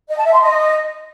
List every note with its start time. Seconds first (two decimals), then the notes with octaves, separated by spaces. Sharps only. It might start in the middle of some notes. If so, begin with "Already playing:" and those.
0.10 D#5
0.17 A5
0.25 E5
0.33 C6
0.41 D#5